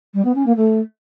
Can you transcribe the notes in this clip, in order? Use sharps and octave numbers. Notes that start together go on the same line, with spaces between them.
G3
B3
C#4
A#3
A3